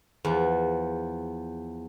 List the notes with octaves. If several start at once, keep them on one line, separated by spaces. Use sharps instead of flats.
E2 F3